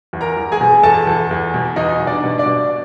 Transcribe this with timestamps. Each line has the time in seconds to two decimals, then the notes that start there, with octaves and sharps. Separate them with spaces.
0.13 E2
0.21 A#4 A#5
0.37 E2
0.52 G#4 G#5
0.61 B2
0.83 E2 A4 A5
1.07 E2
1.31 E2
1.54 B2
1.76 E2 D#4 D#5
2.00 B2
2.07 D4 D5
2.24 B2
2.38 D4 D5
2.46 B2